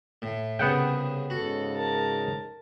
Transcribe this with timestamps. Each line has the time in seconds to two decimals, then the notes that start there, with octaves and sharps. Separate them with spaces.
0.22 A2
0.59 C2 C#3 B3 F#5 G5
1.30 G#2 C#3 F#4 A4
1.76 A#4 A5